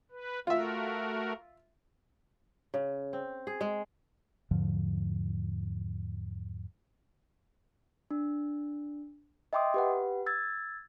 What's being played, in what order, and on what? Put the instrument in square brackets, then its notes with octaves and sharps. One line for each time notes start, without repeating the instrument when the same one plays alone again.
[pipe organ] B4
[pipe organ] A3 F#4 A#4 [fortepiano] F4 E5
[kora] C#3
C4
G#4
G#3
[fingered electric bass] E2 G#2 D3 F3
[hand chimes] D4
D#5 E5 G5 C6 D6 D#6
G4 B4 F#5
E6 G#6 A6